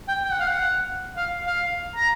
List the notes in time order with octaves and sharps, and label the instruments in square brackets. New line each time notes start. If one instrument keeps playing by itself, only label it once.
[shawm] G5
G5
F#5
F5
F#5
F5
F5
A#5